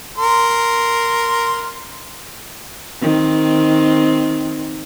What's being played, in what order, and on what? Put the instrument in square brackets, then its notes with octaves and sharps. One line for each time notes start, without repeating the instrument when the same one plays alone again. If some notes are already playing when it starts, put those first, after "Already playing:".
[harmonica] A#4 C6
[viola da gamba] D#3 C4